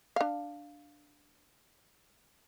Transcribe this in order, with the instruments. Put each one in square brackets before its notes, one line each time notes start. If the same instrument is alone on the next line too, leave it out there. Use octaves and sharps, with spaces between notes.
[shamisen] D4 F5